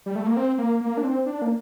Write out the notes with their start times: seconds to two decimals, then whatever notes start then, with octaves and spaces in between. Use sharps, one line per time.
0.06 G3
0.16 A3
0.27 A#3
0.37 C4
0.58 A#3
0.81 A#3
0.97 D4
1.04 C4
1.26 D4
1.42 A#3